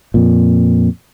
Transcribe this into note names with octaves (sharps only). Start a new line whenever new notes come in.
F2 A#2